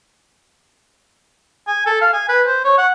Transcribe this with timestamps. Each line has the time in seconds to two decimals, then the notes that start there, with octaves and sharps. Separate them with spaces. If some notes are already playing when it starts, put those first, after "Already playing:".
1.68 G#5
1.86 A4
2.01 F5
2.13 G#5
2.29 B4
2.47 C5
2.64 C#5
2.78 F#5